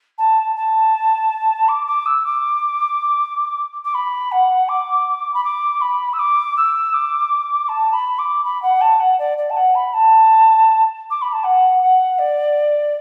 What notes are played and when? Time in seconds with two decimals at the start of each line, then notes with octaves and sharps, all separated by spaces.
0.18 A5
0.56 A5
1.68 D6
1.87 D6
2.05 E6
2.25 D6
3.84 D6
3.94 B5
4.31 F#5
4.68 D6
5.34 B5
5.44 D6
5.80 B5
6.13 E6
6.18 D6
6.56 E6
6.93 D6
7.68 A5
7.93 B5
8.18 D6
8.44 B5
8.62 F#5
8.81 A5
8.99 F#5
9.18 D5
9.37 D5
9.50 A5
9.56 F#5
9.74 B5
9.93 A5
11.10 D6
11.21 B5
11.32 A5
11.44 F#5
11.81 F#5
12.18 D5